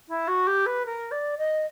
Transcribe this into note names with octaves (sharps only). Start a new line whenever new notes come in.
E4
F#4
G4
B4
A#4
D5
D#5